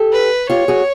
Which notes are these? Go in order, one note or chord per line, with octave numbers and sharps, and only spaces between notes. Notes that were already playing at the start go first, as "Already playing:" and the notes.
Already playing: G4 A4
B4
F4 G4 C#5
F#4 G#4